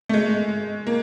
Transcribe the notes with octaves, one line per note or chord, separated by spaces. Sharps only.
A3
G#3
A#3